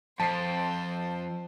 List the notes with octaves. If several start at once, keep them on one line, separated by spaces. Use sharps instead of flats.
F2 C5 A5 C7